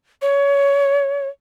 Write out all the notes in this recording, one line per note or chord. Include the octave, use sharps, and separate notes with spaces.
C#5